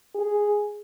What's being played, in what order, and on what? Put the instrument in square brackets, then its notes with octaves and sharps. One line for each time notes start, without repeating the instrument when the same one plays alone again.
[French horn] G#4